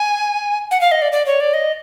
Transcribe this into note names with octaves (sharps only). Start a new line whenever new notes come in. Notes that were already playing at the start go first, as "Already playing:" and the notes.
Already playing: G#5
F#5
F5
D#5
D5
D5
C#5
D5
D#5